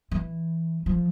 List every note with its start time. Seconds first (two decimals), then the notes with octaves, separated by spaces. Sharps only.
0.11 E3
0.86 F3